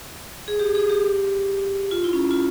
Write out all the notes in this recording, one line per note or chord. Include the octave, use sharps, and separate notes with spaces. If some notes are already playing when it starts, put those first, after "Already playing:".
G#4
G4
G#4
G4
F4
E4
C#4
F4